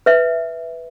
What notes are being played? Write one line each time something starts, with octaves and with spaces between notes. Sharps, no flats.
B4 E5